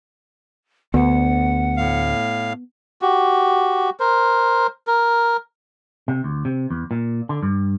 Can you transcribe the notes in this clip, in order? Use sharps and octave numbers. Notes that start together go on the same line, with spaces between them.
D2 B3 F#5
A2 F5
F#4 G4
A#4 C5
A#4
C3
D2
C3
E2
A#2
D3
G2